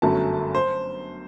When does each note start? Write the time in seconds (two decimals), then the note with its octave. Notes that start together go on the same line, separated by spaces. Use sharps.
0.02 G1 F#2 F#3 A3 A5
0.55 C5